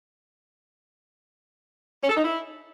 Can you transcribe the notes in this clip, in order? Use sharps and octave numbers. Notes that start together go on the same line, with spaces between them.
C#4
A4
D#4
E4